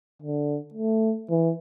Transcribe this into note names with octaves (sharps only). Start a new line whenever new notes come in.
D3
A3
E3